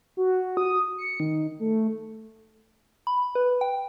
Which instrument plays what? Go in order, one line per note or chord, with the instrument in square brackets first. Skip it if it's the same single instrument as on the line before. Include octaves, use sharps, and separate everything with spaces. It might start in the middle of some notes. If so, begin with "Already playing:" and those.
[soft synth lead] F#4
D#6
C#7
D#3
A3
[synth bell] B5
B4
G5